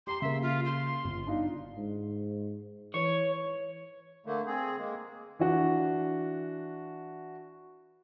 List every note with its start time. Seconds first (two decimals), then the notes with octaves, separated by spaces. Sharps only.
0.07 G4 A#5 C6
0.22 C#3 A#3 E5
0.42 F4
0.65 C6
1.04 G1
1.27 D4 D#4 F4
1.77 G#2
2.94 E3 C#5
4.26 D3 A3 A#3
4.47 C4 G#4
4.78 G#3 A#3
5.39 E3 D4 F#4